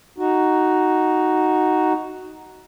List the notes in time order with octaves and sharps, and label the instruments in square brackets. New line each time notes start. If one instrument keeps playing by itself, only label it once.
[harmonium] D#4 F#4